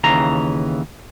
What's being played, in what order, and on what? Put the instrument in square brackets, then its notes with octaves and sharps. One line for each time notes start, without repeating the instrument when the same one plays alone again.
[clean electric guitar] D#2 C#3 E3 A#5